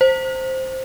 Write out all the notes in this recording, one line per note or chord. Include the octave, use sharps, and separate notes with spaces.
C5